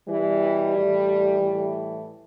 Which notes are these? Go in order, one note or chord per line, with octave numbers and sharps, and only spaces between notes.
B2 E3 G3
A2 E3
A2 E3